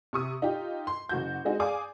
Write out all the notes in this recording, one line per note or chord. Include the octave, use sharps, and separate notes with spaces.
C3 C#6 D#6
D#4 F4 G4
C6
F#1 F#4 G6
G#3 C4 D#4 F#4 G#4
G#4 D5 F5 G#5 D6 D#6